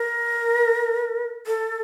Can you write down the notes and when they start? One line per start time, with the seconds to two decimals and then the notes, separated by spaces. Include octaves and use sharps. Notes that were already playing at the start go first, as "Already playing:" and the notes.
Already playing: A#4
1.47 A4